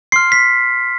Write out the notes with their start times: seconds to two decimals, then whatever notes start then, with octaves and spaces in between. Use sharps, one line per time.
0.12 C6 F6 C7
0.32 B6